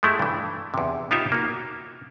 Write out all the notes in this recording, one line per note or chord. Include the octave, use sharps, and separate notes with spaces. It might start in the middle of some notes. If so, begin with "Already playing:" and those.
G#3 A3 E4 G4
G2 E3
E2 C3
B3 D#4 F4 G4 C#5 E5
A#3 F#4